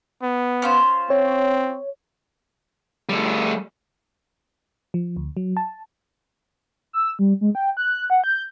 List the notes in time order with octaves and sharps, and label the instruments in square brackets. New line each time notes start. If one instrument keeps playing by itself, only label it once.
[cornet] B3
[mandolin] C#4 F4 C5
[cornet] C4 [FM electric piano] C#5
[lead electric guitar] G3 A3
[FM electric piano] F3
D2
F#3
A5
[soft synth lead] E6
G3
G#3
G5
F#6
F#5
G6